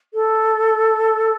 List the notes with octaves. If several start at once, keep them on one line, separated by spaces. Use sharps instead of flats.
A4